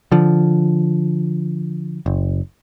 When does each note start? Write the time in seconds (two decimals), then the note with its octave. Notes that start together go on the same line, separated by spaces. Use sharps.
0.12 D3 F3
2.06 F#1